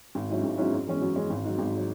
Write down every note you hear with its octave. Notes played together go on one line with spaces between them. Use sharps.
G#1
G#2 F#3 C#4 E4
G#1
G#2 F#3 C#4 E4
F#2
E3 G#3 C#4
F#2
E3 G#3 C#4
G#1
G#2 F#3
G#1
F#3